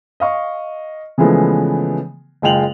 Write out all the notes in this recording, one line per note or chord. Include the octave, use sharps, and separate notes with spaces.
D#5 F5 C#6
C#3 E3 F3 G#3 A3 B3
F#1 G#3 F4 G5 F7 F#7